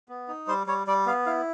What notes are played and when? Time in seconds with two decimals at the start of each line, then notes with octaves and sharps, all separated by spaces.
0.09 B3
0.28 D#4
0.47 G3 C5
0.67 G3 C#5
0.87 G3 D5
1.06 B3 F5
1.26 E4 F5